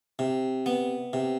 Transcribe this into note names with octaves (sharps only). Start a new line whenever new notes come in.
C3
B3
C3